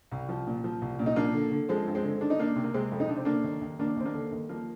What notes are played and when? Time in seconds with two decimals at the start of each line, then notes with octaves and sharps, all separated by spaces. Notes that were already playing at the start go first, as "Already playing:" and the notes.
0.12 C2
0.29 F3
0.47 A#2
0.64 F3
0.82 C2
0.99 A#2
1.06 D#4
1.16 F3 A#3 D4
1.34 D3
1.52 D3
1.69 F3 G#3 C4
1.87 G2
1.95 G#3 C4
2.04 D3
2.21 D#3 D4
2.30 D#4
2.38 D#3 A#3 D4
2.56 C3
2.64 A#3
2.74 C3 G#3 C4
2.92 F2
3.00 D#4
3.09 C3 D4
3.17 C4
3.25 D3 A#3 D4
3.44 D#2
3.61 D#2
3.79 D#2 A#3 D4
3.96 D#2 C4
4.05 A#3 D4
4.14 D3
4.32 D#2
4.49 F3 A#3